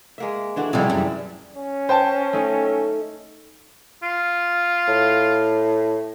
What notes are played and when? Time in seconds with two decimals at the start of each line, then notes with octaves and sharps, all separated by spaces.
0.18 G#3 A#3 E5
0.56 D3 E3 D4 F#4
0.73 F2 C3 G3 E4 G#4
0.90 A1 F#2 G3
1.56 C#4
1.89 C5 G5 A5
2.33 A3 D#4
4.03 F4
4.88 A2